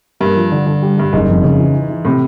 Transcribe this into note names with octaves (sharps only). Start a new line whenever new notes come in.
G2 A#3
F3
D3
D3
G3
G2 G3
F#1 G#2
F2
C#3
E3
E3
E3
A2 C3